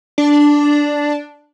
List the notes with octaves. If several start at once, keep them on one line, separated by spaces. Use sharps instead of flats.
D4